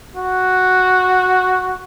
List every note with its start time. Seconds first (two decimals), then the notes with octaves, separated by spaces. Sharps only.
0.16 F#4